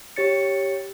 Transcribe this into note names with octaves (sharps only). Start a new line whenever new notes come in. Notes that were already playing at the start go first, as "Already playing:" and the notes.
G4 C#5 A6 C#7